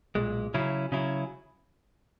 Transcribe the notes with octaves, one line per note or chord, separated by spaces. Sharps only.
B1 A#2 G#3
C#3 F#3 C#4 E4
C#3 F#3 C#4 E4